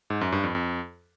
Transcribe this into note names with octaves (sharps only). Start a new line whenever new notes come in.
G#2
F#2
G2
F2
F2